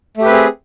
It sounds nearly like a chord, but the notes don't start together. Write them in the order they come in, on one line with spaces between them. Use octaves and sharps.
A3 G4 B4 C4 G#4